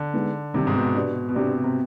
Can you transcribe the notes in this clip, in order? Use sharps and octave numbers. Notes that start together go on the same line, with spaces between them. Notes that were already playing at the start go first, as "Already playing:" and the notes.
Already playing: D3
G#3 B3 D#4
C3 D#3 G3 D4
G#2
B2
B3 D4 G4 B4 D5
B2
C3 B3 D4 G4 D5
C3